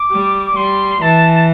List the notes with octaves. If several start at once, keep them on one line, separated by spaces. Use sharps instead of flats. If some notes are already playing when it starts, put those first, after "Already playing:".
Already playing: D6
G3
D6
G3 C6
E3 A5